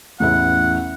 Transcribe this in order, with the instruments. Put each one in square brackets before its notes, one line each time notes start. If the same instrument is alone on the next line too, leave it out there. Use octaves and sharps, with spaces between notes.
[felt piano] A1 E2 E4 [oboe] F#5